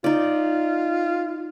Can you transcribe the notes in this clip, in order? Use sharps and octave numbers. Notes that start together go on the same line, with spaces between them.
D#4 F4 D5